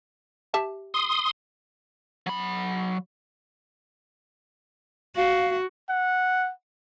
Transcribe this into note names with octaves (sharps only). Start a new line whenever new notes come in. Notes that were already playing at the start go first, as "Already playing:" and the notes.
G4 E5 A5
C6 D#6
F#3 B5
F#4 F5
F#5